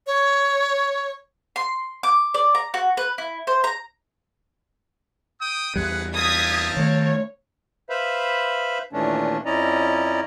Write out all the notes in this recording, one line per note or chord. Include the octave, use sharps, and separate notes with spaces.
C#5
C6
D6
D5
A#5
F#4
B4
E4
C5
A#5
G5 D#6
E2 G3 G#4 B4 F#5
C4 F5 A5 D#6 G#6 B6
D#3 A3 C#5
B4 C5 E5 F5 B5
D#2 A#2 E3 A3 C#4 D4
F2 C#4 E4 D5 D#5 A#5